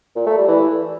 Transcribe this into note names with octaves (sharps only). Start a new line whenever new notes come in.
A#2
A3
G3
E3